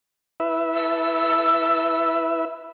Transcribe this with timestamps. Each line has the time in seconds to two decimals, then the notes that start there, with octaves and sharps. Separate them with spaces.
0.40 E4 B4 E5
0.72 E6